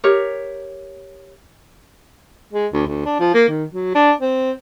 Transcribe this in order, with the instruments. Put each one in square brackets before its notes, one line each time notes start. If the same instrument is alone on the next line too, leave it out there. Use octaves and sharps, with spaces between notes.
[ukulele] G4 A#4 C#5
[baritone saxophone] G#3
D2
D2
D4
F3
A#3
D#3
F#3
D4
C4